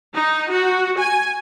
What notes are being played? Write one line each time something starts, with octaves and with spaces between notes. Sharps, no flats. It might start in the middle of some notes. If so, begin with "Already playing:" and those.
D#4
F#4
G#5